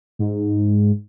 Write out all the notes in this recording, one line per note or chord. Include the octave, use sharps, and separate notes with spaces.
G#2